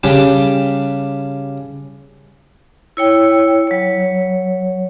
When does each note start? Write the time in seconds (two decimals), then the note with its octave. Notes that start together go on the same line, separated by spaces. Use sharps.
0.04 C#3 G3 D4 G4
2.97 E4 C#5 G5
3.67 F#3 C#5